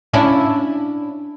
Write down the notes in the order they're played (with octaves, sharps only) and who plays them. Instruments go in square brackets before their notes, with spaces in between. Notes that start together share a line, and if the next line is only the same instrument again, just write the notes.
[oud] C#4 D4 E4